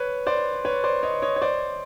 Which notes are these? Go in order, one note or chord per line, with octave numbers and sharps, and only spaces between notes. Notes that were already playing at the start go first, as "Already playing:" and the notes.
Already playing: B4 C#5
C5 D5
B4 C#5
C5 D5
C#5 D#5
C#5 D#5
C#5
C5 D5